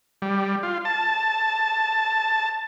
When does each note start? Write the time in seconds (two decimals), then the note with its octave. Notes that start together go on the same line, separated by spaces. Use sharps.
0.22 G3
0.63 F4
0.85 A5